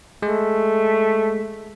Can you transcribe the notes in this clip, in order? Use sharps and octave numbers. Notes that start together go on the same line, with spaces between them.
G#3 A3